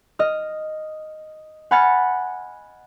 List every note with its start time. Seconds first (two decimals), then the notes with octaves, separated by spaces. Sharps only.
0.19 D#5 F6
1.71 F#5 G#5 B5 F6 A6 C#7